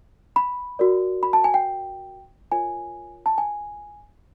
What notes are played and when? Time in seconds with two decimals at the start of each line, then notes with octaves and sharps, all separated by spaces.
0.36 B5
0.79 F#4 A#4 D5
1.23 B5
1.33 A5
1.44 G#5
1.54 G5
2.52 F4 A#4 C#5 G#5
3.26 A5
3.38 G#5